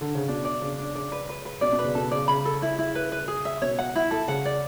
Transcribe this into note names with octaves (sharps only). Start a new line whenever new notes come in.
D3
C#3
B2 D4
D5
C#3 D4
D4
C#3 D5
B4
B4
B4
B2 D5
B2
C#3 B4
B2 A4
C#3 D5
C#3 B5
A4
E4
E4
B4
B4
G#4
E5
B2 C#5
F#5
E4
A4
C#3 F#5
D5